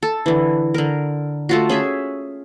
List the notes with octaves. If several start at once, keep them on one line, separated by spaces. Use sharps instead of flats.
A4
D3 E3
D3 A#4
A3 F4 F#4
C#4 G#4 E5